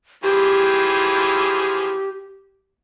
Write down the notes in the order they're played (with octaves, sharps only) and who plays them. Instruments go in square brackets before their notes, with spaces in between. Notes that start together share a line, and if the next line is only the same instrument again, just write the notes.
[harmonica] E3 F3 G#4 [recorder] G4